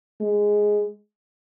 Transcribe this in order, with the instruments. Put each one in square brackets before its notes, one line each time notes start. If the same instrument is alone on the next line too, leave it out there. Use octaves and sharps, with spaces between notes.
[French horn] G#3